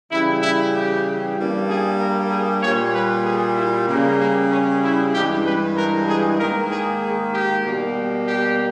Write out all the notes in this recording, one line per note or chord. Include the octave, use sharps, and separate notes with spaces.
C#3 E3 G3 E4
E4
G4
G2 G3 A#3
G#4
A#4
G#4
A#2 G3 A#3 C#5
B4
G#4
E4
C#3 G3 A#3
A#3
C#4
E4
G2 E3 G#3 G4
B4
A#4
G#4
G#2 D#3 A#3 A#4
G#4
G#4
G4
B2 G3 A#3
G4